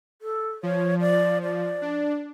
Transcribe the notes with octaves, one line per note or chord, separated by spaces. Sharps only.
A4
F3 C#5
D5
D5
D4